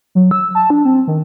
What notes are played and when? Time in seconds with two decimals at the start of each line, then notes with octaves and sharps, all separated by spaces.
0.15 F#3
0.31 E6
0.55 A5
0.70 D4
0.85 C4
1.07 D#3